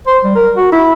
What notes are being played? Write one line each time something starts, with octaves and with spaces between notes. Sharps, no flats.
C5
G3
A#4
F#4
E4